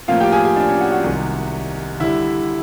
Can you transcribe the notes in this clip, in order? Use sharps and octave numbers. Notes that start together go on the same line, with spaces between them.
A2 F3 A#3 F4 F5
G4 G5
G#4 G#5
G#4 G#5
D4 D5
C#4 C#5
F#4 F#5
F#4 F#5
C2 C3 D#3 G#3
D3 G3 E4 E5